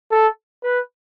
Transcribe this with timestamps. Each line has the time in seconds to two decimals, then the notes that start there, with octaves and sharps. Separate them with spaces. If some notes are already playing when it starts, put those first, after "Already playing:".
0.11 A4
0.63 B4